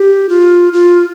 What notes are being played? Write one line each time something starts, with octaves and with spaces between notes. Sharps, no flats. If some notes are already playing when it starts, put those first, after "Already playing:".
Already playing: G4
F4
F4